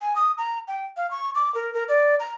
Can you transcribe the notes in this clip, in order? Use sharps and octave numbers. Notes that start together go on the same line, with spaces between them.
G#5
D#6
A#5
G5
F5
C#6
D6
A#4
A#4
D5
A#5